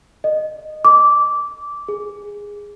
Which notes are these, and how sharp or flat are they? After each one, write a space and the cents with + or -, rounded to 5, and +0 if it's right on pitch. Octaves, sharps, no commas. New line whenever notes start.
D#5 -15
D6 -15
G#4 -10